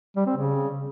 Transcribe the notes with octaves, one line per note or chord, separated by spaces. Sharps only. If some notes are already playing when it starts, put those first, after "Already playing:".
G3
C4
C#3